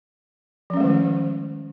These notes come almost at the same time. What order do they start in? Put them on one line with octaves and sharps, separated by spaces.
F3 C#4 G#3 A3 D#3